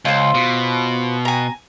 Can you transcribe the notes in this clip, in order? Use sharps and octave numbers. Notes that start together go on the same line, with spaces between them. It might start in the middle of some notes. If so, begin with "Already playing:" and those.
C#2 F4 C5
B2
G#5 A#5